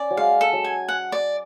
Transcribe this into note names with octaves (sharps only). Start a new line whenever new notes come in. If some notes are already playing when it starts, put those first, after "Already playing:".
Already playing: C#4 D5
F#3
G#3 F5
A4
F#3
G#5
F#5
D5